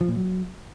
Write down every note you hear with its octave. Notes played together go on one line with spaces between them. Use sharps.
F3
A#2
F#3